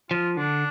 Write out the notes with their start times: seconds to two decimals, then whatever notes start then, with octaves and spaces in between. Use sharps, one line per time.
0.11 F3 F4
0.37 D3 D4